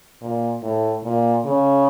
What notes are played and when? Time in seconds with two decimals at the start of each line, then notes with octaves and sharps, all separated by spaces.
0.21 A#2
0.62 A2
1.04 A#2
1.45 C#3